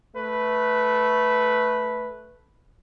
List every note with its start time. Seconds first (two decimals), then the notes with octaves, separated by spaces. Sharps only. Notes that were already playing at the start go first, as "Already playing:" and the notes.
0.16 A3 B4